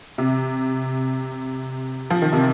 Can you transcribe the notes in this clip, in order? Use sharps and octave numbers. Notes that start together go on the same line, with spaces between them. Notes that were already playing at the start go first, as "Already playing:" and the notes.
C3
F3
D#3
C3